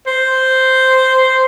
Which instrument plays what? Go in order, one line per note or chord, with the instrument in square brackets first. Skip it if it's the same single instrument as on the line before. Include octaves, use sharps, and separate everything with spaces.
[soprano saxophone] C5